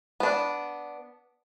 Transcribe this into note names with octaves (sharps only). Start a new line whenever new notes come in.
B3 D4